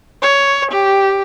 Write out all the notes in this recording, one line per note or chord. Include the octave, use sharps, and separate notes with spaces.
C#5
G4